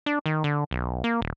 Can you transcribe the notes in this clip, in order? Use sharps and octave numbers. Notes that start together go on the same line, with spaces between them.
D4
D#3
D3
B1
A#3
D#1